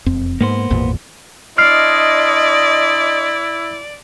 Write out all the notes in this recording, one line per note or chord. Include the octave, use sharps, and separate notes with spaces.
E1 F2 C4
G#2 A#3 B3 C5
G#1 E2 A#2
D4 E4 C5 D5 D#5 F6 C7